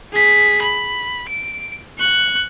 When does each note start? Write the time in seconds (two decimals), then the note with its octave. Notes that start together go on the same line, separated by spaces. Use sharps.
0.13 G#4 B6
0.61 B5
1.28 D7
1.99 C#6 F#6